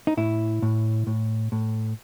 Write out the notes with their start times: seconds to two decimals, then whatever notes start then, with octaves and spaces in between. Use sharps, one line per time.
0.07 D#4
0.17 A2 E4
0.62 A2
1.07 A2
1.52 A2